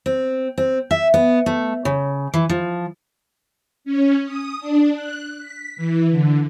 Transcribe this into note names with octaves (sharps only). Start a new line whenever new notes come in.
C4
C4
E5
B3
A3
C#3
E3
F3
C#4
D#6
D4
F#6
B6
E3
D3